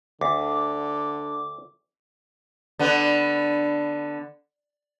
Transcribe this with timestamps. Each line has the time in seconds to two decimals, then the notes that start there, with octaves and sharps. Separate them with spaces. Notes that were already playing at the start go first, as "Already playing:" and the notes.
0.21 D2 D3 D6
2.79 D3 B3